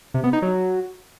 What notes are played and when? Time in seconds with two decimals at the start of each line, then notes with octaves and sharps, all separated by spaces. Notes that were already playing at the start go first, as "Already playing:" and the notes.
0.14 C3
0.24 B3
0.33 D#4
0.42 F#3